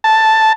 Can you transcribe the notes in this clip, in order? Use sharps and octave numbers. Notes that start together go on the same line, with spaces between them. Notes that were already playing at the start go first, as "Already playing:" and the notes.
A5